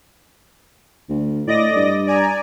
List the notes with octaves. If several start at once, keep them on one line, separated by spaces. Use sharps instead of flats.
D2
A2 D5 D#5 A#6
G2
D5 G#5 A#5